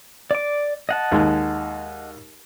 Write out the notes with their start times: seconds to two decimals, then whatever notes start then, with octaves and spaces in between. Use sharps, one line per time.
0.31 D5 D6
0.89 D#5 F#5 A5
1.12 D#2 G#3